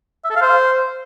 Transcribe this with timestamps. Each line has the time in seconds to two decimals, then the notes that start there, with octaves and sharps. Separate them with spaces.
0.24 E5
0.30 A4
0.36 F5
0.42 C5